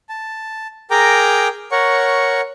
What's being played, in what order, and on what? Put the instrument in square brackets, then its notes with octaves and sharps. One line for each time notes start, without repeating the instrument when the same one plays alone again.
[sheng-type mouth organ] A5
G#4 A#4 G5 A#5 D6
A#4 C#5 F#5 C#6